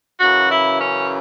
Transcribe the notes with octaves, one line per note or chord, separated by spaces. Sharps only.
F#2 C#3 E3 F#4
E4
C#4